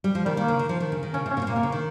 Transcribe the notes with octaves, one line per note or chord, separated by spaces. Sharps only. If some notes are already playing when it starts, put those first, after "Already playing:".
G3
F3
D#3 G3
D#3 A#3
C#3
D#3
F3
D#3
C#3
D#3
C#3 C#4
C3 C#4
A#2
C3
A#2 A#3
C3
C#3
D#3